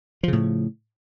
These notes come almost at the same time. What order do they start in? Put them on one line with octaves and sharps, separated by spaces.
F3 C#3 A2